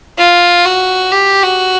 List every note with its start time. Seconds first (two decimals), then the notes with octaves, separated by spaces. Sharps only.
0.18 F4
0.65 F#4
1.12 G4
1.42 F#4